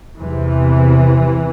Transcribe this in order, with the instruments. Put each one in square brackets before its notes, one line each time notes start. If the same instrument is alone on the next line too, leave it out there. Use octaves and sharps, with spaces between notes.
[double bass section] E2 C3 E3